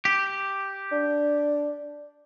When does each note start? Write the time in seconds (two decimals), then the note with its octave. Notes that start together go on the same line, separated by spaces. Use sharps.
0.05 G4
0.92 D4